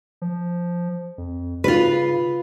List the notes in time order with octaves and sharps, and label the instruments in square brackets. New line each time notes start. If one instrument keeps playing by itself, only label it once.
[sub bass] F3
F2
[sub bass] C#3 [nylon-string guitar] F4 B4